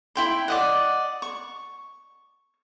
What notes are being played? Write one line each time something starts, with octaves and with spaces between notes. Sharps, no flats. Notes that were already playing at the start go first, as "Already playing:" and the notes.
E4 G5 C6
D5 D#5 F#5
C#6